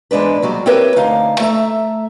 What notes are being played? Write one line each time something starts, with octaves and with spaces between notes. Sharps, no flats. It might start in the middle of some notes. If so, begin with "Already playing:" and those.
E2 G#2 G#3 D4 B4
D#2 F#3 G3
C4 E4 G4 A#4 B4 C#5
D2 D#4 F5
A3 A4 E5 A#5